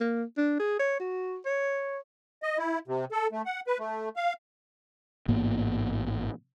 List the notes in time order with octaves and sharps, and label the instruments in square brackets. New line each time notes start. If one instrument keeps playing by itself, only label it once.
[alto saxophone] A#3
D4
G#4
C#5
F#4
C#5
[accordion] D#5
E4
C3
A4
A3
F#5
B4
A3
F5
[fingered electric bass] A1 G#2 A#3 B3